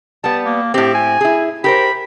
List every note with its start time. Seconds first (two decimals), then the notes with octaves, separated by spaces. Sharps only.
0.24 G3 B3 A5
0.45 A#3
0.74 A2 C4 G4
0.94 G#5
1.21 E4 G#4
1.64 G4 A#4 C5 B5